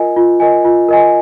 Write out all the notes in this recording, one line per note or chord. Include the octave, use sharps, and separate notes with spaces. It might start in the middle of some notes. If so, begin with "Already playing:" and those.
Already playing: F4 A#4 D#5 G#5
F4
A#4 D#5 G#5
F4
A#4 D#5 G#5